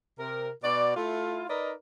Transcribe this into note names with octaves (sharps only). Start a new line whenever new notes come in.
C3 A#4
B2 F#4 D5
A3 E4 F4
D#4 A#4 B4 D5 D#5